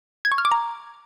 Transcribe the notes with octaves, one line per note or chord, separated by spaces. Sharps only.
G#6
C#6
F6
D6
A#5